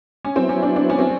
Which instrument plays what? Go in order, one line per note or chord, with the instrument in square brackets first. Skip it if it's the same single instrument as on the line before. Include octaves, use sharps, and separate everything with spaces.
[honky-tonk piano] C#4
[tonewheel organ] F#3 B3 E4 [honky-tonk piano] C4
[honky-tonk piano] C#4
D4
D4
C#4
C4